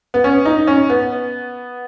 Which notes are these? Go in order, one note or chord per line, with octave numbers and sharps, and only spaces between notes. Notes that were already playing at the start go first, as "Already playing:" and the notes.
B3
C#4
D#4
C#4
B3